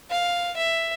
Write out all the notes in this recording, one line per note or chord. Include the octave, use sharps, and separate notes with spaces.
F5
E5